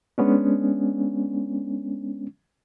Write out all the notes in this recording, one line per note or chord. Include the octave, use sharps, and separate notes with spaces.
G#3 B3 C#4 D4